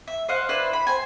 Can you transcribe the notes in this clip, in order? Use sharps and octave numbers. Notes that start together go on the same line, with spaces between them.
E5
C5 D#5 F5 F#5
D4 E4 B4 C5
B5
C5 G#5